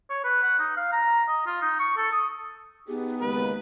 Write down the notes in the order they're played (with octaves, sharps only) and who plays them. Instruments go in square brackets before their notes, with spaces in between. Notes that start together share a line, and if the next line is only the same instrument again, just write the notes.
[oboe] C#5
B4
F#5
D#4
F5
A#5
D#5
F4
D#4
C#6
A4
D#6
[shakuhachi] B3 [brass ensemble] D#4 G4 G#4
[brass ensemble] D#2 C#3 G#3 [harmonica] B4